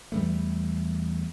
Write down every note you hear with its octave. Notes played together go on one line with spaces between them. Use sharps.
E2 G3 A3